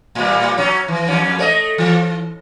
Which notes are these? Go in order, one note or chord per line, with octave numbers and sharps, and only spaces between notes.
A2 G3
F#3 C#4
E3
F2 C#4
A3 C#5 D#5
E3